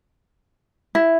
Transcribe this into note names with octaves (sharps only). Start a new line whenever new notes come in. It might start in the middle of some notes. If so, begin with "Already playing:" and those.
E4